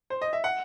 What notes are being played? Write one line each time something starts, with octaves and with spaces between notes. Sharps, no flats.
C5
D#5
E5
F#5